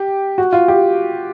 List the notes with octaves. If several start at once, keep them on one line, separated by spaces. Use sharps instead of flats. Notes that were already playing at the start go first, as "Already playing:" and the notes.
Already playing: G4
F#4
F4
G4